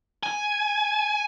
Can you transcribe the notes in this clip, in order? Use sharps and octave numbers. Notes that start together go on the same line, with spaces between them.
G#5